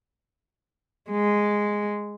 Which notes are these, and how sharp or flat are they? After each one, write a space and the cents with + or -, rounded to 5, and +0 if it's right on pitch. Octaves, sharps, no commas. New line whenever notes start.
G#3 -5